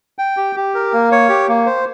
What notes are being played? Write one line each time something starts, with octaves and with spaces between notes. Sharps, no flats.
G5
G4
G4
A#4
A#3
C#5
G4
A#3
C5